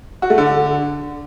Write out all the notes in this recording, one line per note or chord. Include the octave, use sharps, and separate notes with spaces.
F#4
A3
D3